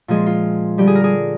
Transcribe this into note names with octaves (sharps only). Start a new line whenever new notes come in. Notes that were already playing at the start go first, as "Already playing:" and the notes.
A#2 F3 G#3 G#4
F4
D3 G3 G4
G#4
A#4
G#4